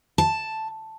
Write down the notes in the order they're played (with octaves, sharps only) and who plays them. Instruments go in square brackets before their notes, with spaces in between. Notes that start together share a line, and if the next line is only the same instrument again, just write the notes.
[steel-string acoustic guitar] A5